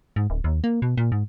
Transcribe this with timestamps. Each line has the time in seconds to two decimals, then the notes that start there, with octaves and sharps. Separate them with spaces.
0.16 G#2
0.30 D1
0.44 D#2
0.64 A#3
0.82 B2
0.97 A#2
1.12 G#2